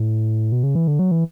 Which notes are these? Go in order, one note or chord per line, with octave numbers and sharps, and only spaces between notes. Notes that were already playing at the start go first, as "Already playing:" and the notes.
Already playing: A2
B2
C#3
E3
D3
F#3
E3